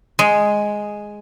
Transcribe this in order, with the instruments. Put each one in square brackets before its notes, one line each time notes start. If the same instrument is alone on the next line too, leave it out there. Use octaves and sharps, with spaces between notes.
[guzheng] G#3